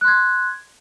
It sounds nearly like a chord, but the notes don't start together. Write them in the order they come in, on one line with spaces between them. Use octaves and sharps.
F#6 C6 G#6